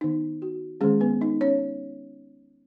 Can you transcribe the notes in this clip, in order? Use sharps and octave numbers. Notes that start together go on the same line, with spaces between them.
D#3 B3 D#4
F#4
D#3 G#3 C#4 G#4
B3 B4
D#4 D#5
C#4 C#5